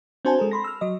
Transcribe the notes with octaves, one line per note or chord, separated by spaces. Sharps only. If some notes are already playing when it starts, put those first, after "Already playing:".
C4 D4 F#4 C5 G#5 A5
G#3 A4 A#4
B5 C6 A#6
E6 F6
F#3 D#5